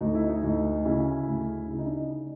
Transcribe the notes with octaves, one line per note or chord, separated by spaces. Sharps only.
D2 D#4
E4
D#4
D2
C#3 E4
D2
C#3 E4
D#4
D4
D#4